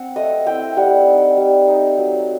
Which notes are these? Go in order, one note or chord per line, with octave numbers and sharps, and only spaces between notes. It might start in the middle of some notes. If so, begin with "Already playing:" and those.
Already playing: C4 F#5
A3 D#5
C4 E4 G5
G3 F#5
D#4
G3
D#4
F#3